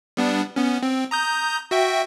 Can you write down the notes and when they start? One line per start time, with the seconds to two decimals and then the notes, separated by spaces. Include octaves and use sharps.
0.17 G3 B3 D4
0.56 B3 C#4
0.83 C4
1.11 A#5 D#6 G6
1.71 F#4 E5 G5